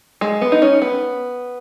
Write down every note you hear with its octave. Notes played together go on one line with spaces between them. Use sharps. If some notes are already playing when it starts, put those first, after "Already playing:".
G#3
B3
D#4
C#4
B3